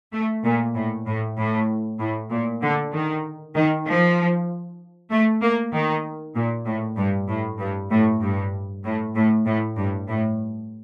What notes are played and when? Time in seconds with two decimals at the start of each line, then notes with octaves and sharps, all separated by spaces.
0.12 A3
0.44 A#2
0.75 A2
1.06 A2
1.37 A2
1.99 A2
2.30 A#2
2.62 D3
2.92 D#3
3.55 D#3
3.86 F3
5.11 A3
5.41 A#3
5.72 D#3
6.35 A#2
6.66 A2
6.97 G2
7.28 A2
7.59 G2
7.90 A2
8.21 G2
8.84 A2
9.15 A2
9.46 A2
9.77 G2
10.08 A2